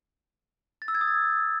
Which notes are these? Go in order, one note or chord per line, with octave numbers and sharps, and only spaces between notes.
A6
E6
G#6
D#6
A6